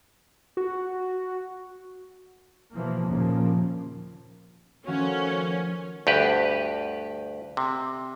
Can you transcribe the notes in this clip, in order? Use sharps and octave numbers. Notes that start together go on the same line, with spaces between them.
F#4
B2 E3 F3 A#3
D#2 A#2 C#3 F3 A#3
D#3 F3 A3 C#4 F#4
D2 G2 G4 B4
C3